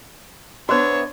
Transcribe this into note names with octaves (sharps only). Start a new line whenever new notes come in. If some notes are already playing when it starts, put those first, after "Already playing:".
B3 D4 F#4 C5 C#5 E5